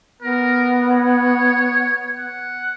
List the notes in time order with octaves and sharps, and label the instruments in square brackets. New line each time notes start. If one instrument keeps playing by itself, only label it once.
[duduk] B3 [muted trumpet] A#4
[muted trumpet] C#5
F#5